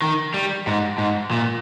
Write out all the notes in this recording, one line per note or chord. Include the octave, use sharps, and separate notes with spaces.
D#3
G3
G#2
G#2
A#2